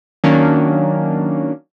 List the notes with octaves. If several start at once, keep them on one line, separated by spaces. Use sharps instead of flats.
D#3 F#3 A#3 C#4 D4